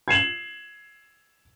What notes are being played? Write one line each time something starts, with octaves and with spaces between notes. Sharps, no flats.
G#6 C7 E7 F#7